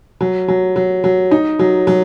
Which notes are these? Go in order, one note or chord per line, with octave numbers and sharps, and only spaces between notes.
F#3
F#3
F#3
F#3
D#4
F#3
F#3